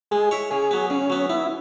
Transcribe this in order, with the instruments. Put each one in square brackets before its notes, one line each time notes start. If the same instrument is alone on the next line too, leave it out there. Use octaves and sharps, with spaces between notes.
[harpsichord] G#3 [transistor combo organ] G#4
[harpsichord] E4 C#5
[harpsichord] C#3 [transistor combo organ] G#4
[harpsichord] F#3 B3
[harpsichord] C#3 [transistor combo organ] C#4
[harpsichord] F#3 B3
[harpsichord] B3 [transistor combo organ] E4